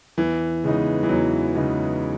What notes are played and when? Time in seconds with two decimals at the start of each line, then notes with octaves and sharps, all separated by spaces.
0.18 E2 E3
0.64 C#3 G#3 B3 D#4
1.03 E3
1.09 E2 F#3
1.55 C#3 G#3 B3 D#4